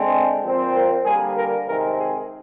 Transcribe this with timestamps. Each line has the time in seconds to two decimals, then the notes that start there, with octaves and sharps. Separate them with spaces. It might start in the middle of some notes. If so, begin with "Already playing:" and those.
Already playing: D3 G#3 C4
0.43 A#2 F3 C4
0.74 A#4
1.04 D3 G3 A#3 G#4
1.36 A#4
1.66 C3 D#3 G#3 C4 A#4
1.97 G#4